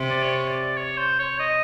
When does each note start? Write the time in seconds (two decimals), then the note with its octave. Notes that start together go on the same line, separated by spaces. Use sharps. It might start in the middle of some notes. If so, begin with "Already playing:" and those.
Already playing: C3
0.10 D5
0.22 C#5
0.49 D5
0.76 C#5
0.98 C5
1.19 C#5
1.39 D#5